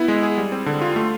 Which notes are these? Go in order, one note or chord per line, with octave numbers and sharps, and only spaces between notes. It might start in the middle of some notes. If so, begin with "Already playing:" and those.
Already playing: B3 E4
G#3
G#4
G3
C4
D3
F4
A3